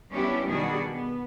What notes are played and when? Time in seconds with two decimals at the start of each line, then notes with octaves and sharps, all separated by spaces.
0.11 G3 B3 C#4 D4 E4 G4
0.47 B2 D#3 G3 D4 F#4 G#4
0.91 B3